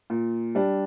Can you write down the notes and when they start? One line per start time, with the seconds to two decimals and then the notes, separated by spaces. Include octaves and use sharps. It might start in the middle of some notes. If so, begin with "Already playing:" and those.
0.10 A#2
0.55 G3 D4 G4